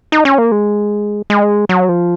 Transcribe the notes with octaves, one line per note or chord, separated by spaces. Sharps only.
D#4
C#4
A#3
G#3
G#3
F#3
F3